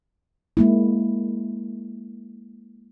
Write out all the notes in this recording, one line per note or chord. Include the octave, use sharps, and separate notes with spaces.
G#3 A#3 E4